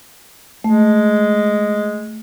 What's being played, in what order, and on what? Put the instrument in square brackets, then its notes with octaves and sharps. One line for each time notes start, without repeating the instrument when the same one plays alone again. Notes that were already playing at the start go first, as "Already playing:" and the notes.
[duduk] G#3 [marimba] A3